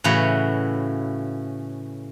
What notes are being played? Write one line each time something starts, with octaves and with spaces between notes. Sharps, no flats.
A2 C#3 E3 F#4 B4 C#5